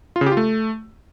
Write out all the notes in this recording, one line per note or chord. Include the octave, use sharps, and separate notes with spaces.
F4
C#3
G4
F4
A3